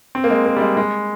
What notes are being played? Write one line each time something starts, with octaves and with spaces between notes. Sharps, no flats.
C4
A#3
G#3
A#3
G3
G#3
G#3